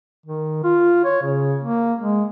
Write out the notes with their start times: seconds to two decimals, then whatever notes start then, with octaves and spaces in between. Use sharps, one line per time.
0.26 D#3
0.64 F4
1.05 C#5
1.23 C#3
1.62 A#3
2.00 G#3